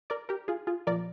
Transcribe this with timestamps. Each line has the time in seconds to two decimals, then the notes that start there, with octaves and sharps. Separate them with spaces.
0.10 A#4 D5
0.29 G4 A#4
0.48 F4 G#4
0.67 F4 G#4
0.87 A#2 F3 A#4 D5